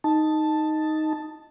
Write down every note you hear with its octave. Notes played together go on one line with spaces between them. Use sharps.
D#4 A5